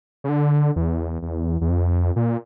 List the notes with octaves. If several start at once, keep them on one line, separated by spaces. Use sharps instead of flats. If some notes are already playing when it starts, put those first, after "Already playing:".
C#3
D3
E2
E2
E2
F2
A#2